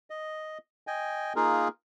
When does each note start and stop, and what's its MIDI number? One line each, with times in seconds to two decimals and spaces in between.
0.10 0.58 75
0.87 1.33 75
0.87 1.33 79
0.87 1.33 80
1.36 1.68 58
1.36 1.68 63
1.36 1.68 65
1.36 1.68 68
1.36 1.68 70